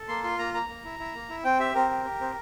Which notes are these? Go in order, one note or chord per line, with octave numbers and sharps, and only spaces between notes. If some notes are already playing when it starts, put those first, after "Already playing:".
Already playing: A4
A#3 C6
F4 C6
A#3 A#5
A#3 A#5
A#3
E4
E4
A#3
E4
C4 G5
G4 E5
C4 A#4
G4
G4
C4